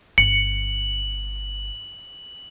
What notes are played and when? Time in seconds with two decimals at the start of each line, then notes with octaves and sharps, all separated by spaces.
0.18 G1 C#7 F#7